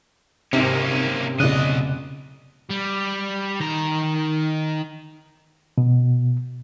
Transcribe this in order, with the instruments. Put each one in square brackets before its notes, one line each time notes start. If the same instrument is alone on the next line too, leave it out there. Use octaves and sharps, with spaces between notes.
[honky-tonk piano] G#1 D#4 [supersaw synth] C3 [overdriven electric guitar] A#3 C#4
[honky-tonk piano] F1 D5 F#6 [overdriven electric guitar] B1 D#5 [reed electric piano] C#3
[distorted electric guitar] G3
D#3 A#5
[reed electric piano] B2